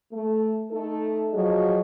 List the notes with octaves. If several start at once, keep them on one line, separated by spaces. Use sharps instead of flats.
A3
A3 D#4 A4
F3 F#3 F#4 G#4 D#5